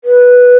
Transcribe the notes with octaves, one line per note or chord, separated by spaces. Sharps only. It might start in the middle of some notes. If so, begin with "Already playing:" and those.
B4